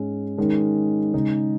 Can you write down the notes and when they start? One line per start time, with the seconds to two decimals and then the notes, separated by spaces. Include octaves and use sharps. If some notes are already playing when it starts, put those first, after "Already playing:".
Already playing: G#2 G#3 C#4
0.38 D#3 G#3 C#4
1.14 C#3 G#3 D#4